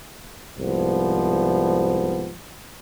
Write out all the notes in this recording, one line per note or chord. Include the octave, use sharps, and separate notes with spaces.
C2 G#2 F3 B3